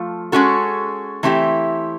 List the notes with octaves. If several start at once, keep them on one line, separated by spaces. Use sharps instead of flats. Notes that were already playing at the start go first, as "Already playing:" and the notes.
Already playing: F3 A3 F4
G#3 C#4 F#4 A4
E3 A3 C4 E4 G4